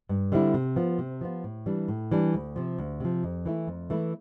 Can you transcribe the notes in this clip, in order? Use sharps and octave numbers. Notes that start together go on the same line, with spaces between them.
G2
D3 G3 C4 E4
C3
F3 B3 F4
C3
F3 B3 F4
A2
E3 G3 D4
A2
E3 G3 D4
D2
C3 F3
D2
C3 F3
F2
E3 A3 E4
F2
E3 A3 E4